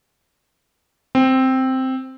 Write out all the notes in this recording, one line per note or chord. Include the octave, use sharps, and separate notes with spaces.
C4